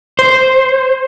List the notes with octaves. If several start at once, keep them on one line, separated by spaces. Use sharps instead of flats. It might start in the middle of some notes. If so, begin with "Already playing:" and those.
C5